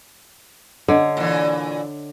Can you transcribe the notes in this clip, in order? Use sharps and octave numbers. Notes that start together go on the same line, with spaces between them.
D3 C#5 D#5
A#2 E3